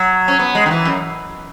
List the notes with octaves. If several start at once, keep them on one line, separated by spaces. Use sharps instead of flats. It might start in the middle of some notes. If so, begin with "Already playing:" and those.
Already playing: F#3
C#4
B3
G#3
D#3
E3
F#2